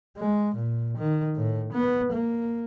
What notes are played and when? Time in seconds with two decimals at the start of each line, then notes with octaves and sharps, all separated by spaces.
0.17 G#3
0.56 A#2
0.97 D#3
1.35 A2
1.72 B3
2.12 A#3